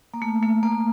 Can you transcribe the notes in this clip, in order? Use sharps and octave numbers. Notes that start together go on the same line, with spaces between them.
A#3
A3
A3
A#3